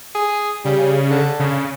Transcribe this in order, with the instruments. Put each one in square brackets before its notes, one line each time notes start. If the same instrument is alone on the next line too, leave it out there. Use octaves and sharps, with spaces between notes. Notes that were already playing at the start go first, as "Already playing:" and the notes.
[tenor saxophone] G#4
[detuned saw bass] C#3 [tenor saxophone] G3
[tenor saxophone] D3
[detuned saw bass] C#3